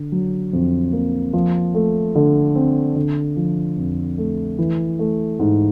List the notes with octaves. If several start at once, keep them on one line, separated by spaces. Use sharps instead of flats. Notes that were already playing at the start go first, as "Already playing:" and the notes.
Already playing: D3
F#3
F2
A#3
F3
A3
D3
C4
D3
F3
F2
A3
E3
A3
G#2